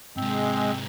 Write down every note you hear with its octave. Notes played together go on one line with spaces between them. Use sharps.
G#2 C3 G#3 C4